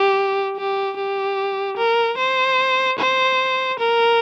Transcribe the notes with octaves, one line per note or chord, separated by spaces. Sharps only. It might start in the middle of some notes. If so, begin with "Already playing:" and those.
Already playing: G4
G4
G4
A#4
C5
C5
A#4